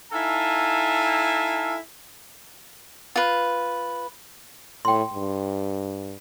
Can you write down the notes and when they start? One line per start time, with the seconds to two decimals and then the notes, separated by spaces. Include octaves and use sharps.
0.13 D#4 E4 A4 F5 G#5 A5
3.16 F4 B4
4.85 A2 G5 C6
5.14 G2